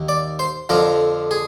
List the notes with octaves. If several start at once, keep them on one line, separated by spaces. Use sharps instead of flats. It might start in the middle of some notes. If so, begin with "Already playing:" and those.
Already playing: D#2 D#3
D5
C5
F2 D3 F3 A#4
G#4